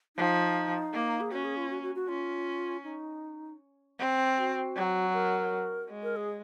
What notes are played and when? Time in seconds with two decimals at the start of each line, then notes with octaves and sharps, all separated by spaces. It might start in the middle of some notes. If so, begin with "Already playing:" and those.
0.17 F3 D#4
0.93 A#3
1.21 G#4
1.32 C#4 F#4
1.44 G#4
1.57 F4
1.70 F#4
1.83 F#4
1.95 F#4
2.08 C#4 F4
2.84 D#4
3.99 C4
4.37 F#4
4.76 F#3
5.13 A#4
5.89 G#3
6.03 A#4
6.16 G#4